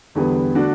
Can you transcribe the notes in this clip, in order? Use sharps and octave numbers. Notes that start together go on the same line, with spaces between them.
E2 D3 G3 B3
D3 A3 D4 F#4